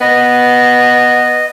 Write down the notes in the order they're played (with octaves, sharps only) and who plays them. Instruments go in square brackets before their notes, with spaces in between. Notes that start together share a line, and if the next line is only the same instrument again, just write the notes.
[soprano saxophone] B3 [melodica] D#5